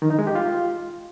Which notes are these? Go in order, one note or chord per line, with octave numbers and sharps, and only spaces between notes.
D#3
D#4
G#3
G4
F4